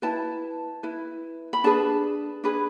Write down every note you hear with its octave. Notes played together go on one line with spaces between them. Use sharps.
E4 B4 A5
E4 B4
B5
D4 G#4 B4 A5
D4 G#4 B4